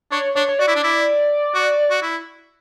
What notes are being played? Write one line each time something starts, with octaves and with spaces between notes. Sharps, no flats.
D4 C#5
D4 C#5
C#5
F#4 D5
E4
D4
E4
F#4
F#4
E4